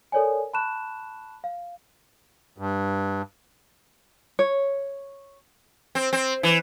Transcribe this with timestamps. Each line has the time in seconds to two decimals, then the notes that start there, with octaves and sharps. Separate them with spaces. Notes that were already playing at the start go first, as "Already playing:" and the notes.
0.12 A4 A#4 C#5 D5 G#5
0.53 A5 B5 C#6 F#6 E7
1.44 F5
2.58 G2
4.39 C#5
5.95 C4
6.13 C4
6.43 E3